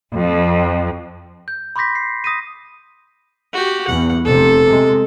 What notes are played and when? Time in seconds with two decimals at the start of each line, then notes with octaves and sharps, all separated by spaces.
0.13 F2
1.48 G6
1.76 B5 C6 D6 G6 A#6 B6
1.95 C7
2.24 D#6 A#6 B6 D#7
3.53 F#4 G4
3.88 E2 F#5
4.25 F1 C3 A4
4.65 C3 G#3